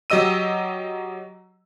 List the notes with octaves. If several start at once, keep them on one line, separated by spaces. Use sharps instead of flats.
F#3 G4 D#5 E6 D#7